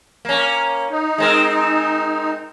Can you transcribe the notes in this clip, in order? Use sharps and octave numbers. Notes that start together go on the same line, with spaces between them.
A#3 C#4
D#4
G#3 C4 A#4